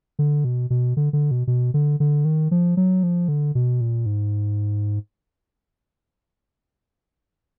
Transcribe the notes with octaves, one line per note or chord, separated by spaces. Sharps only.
D3
B2
B2
D3
D3
B2
B2
D3
D3
D#3
F3
F#3
F3
D3
B2
A#2
G#2